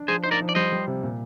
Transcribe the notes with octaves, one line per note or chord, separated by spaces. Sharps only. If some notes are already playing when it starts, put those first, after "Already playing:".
Already playing: D4
F3 G#4 C5
D#4 C5
A#4 D5
F3
D5
G3 C5 D#5
G3
C3
A#2